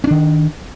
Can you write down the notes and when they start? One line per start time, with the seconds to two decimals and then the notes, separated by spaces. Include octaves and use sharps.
0.04 C#4
0.07 D4
0.11 D#3